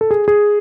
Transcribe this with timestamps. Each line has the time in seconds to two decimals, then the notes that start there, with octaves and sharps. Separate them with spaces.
0.01 A4
0.11 G#4
0.28 G#4